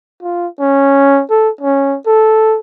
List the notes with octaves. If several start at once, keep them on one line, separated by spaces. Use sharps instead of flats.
F4
C#4
A4
C#4
A4